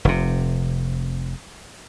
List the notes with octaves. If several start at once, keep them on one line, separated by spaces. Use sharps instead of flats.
F1 C3